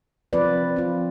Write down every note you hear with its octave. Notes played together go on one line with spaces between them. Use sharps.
F3 C4 F4 B4 D5
F3 C4 F4